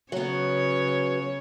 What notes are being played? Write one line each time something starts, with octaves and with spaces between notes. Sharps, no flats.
C#3 F#3 B3 C#5